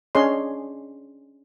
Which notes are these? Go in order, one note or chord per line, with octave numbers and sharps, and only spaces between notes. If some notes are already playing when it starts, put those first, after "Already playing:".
C#4 D4 G#4 C#5 D#5 C6